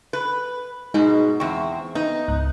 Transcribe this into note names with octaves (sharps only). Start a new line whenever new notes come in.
B4
G#2 B2 G#3 D#4 G#4
E2 C4 C#6
B3 D#4
C#2 G#2 F#6